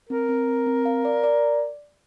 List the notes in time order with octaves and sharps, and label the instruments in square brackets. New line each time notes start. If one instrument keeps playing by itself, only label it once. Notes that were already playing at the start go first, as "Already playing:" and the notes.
[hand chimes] C4 [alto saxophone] A#4
[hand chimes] C4
C4
C4
F5
D5
D5